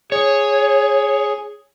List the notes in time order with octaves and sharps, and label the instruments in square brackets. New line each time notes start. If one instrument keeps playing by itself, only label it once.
[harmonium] G#4 [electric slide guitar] C#5